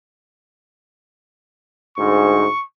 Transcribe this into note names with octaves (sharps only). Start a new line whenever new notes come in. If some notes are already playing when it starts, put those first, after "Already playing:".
D2 G#2 C#6